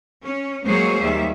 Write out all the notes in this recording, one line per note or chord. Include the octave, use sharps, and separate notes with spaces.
C#4
F#3 G#3 A#3 G#4 C5 C#5
D#2 G3 E5